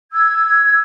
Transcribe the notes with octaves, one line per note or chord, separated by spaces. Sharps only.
E6 G#6